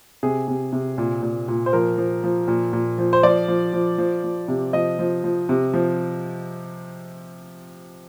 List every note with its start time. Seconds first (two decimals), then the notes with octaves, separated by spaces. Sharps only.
0.23 C3 G#4
0.48 C3
0.73 C3
0.98 A#2
1.23 A#2
1.48 A#2
1.66 C5
1.73 F3 A#4
1.98 F3
2.23 F3
2.48 A#2
2.73 A#2
2.98 F3
3.13 C5
3.23 F3 D5
3.48 F3
3.73 F3
3.98 F3
4.24 F3
4.48 C3
4.73 F3 D#5
4.99 F3
5.24 F3
5.49 C3
5.74 F3